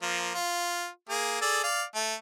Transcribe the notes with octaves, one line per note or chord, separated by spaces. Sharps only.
F3 A#3
F4
A#3 G#4
G#4 A4 D5
D5 F5
A3